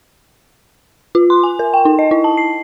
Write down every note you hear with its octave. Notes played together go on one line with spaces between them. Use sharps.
F4
C6
G#5
A#4
G5
D#4
D#5
E4
A5
C7